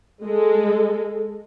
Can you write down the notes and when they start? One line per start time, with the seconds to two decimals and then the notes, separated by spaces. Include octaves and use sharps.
0.24 G#3 A4